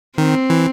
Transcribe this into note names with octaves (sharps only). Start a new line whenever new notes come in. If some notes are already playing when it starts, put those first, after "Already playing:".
D#3 C4
E3